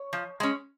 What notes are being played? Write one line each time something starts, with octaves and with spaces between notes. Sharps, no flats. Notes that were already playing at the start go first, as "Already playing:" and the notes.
Already playing: C#5
F3
G#3 C#4